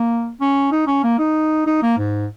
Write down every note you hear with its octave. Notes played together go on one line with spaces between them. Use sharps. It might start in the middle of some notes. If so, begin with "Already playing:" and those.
Already playing: A#3
C#4
D#4
C#4
A#3
D#4
D#4
A#3
G#2